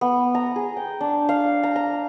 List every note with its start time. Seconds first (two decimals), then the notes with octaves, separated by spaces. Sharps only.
0.01 B3
0.35 A#5
0.56 G#4
0.76 G5
1.01 D4
1.29 F5
1.63 A#5
1.76 A#5